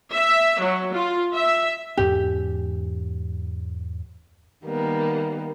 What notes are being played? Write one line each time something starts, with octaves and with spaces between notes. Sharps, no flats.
E5
F#3
F4
E5
E2 G#2 C#4 G4
D#3 G3 A#3 B3